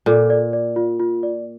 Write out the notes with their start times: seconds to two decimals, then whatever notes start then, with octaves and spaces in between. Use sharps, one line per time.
0.06 A#2 A4
0.30 D5
0.53 D5
0.76 F4
0.99 F4
1.23 D5